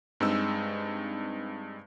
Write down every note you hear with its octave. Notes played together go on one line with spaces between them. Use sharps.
G2 G#3 C4 D#4 E6